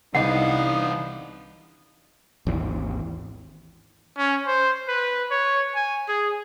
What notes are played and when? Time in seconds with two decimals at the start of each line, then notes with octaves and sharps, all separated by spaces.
0.15 C2 E3 B3 D4 D#4 D#5 F5 F#5
2.47 G#1 D#2 E3
4.18 C#4
4.47 C5
4.89 B4
5.31 C#5
5.75 G#5
6.08 G#4